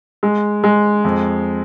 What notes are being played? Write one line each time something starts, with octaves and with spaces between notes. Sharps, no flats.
G#3
G#3
F2